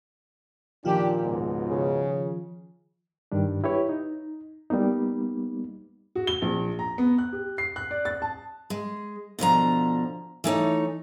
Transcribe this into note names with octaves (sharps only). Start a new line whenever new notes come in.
A#2 D#3 F3 D4 F4 G4
C#2 G#2 B2
C#3
G2 D#3 G3 D4
E4 G4 B4 C#5
D#4
G3 A#3 B3 D#4
F#4
G7
A#1
A#5
B3
F#6
G4
C7
F#6
D5
A6
A5
G#3
B2 D3 F3 A#5
E3 A3 D#4 C#5